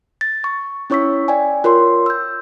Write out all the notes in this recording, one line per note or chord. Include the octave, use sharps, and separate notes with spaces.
A6
C#6
C#4 E4 C#5 C#6 E6 B6
D5 G5 G#5
F4 A#4 C#5 C6
E6 G6